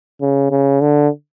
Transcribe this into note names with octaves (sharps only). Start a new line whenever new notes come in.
C#3
C#3
D3